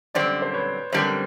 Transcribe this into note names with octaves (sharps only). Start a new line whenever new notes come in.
F#2 D3 G3 C4 C5 D5
C5
B4 C#5
F#2 D3 G3 C4 A#4 C5